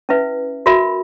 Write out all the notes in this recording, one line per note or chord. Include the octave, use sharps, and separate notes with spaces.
C#4 E4 B4 E5
F#4 A#4 E5 B5